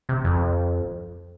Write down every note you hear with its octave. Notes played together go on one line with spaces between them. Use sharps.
C3
F2